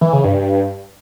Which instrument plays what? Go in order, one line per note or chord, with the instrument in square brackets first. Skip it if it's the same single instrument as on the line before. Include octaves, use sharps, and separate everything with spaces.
[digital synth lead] E3
C#3
G2